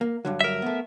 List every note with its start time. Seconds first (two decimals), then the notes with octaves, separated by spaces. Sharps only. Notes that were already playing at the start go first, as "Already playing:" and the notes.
0.01 A#3
0.25 G2 D3 F#3
0.41 A#4 E5
0.62 A3 B3